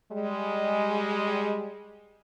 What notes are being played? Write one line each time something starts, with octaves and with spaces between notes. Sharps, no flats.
G3 G#3